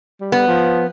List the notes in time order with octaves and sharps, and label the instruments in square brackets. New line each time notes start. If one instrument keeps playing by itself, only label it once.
[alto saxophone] G3
[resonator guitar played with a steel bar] B3
[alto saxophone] F3